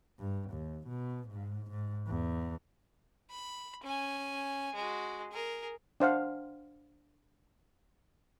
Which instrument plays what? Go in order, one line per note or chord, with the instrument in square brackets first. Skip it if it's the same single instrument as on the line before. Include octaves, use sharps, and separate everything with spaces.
[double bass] G2
D#2
B2
G#2
G#2
E2
[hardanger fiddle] B5
C#4 G#5
G#3 F#4
G#4 A#4
[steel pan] D4 C5 F5 F#5